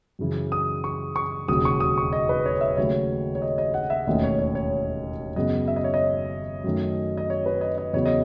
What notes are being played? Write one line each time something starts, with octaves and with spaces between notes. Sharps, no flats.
F#2 C#3 E3
D#6
C#6
C#6
E1 D#2 C#3 F#3 D#6
C#6
D#6
C#6
D#5
B4
C#5
E5
D#2 C#3 F#3 A3 C#5
C#5
D#5
D#5
F#5
E5
E1 D#2 D#3 A3 C#4 D#5
C#5
C#5
C#5
F#2 C#3 G#3 B3 D#5
E5
D#5
C#5
D#5
F#2 D#3 A3 C#4
D#5
C#5
B4
D#5
D#5
E2 C#3 F#3 B3 C#5
D#5